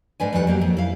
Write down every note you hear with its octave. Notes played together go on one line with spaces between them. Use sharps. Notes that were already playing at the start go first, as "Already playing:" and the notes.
G#2 D4 B4 G#5
F2 D#3 G3 G#4 F#5
F#3 A#3 G4
F2
E4 F5